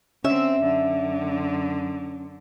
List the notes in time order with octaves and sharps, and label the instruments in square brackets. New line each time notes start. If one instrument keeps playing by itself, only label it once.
[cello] D3 C4 [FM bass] C#4 [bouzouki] E5
[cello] F#2 D3